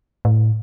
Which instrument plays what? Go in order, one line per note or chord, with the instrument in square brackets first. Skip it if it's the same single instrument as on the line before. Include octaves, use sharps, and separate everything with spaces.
[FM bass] A2